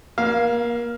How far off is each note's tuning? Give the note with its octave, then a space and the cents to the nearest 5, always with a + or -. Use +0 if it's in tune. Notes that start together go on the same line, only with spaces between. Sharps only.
A#3 +30 F5 +0